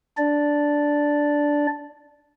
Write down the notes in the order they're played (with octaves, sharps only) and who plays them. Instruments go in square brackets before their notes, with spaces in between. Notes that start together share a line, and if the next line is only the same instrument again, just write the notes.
[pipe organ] D4 D5